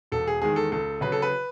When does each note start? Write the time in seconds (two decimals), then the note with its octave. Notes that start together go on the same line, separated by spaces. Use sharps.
0.12 E1 A4
0.27 G#4
0.42 E2 D#3 G#3 G#4
0.56 A4
0.72 C#2 A4
1.01 C#3 F#3 B4
1.12 A4
1.22 B4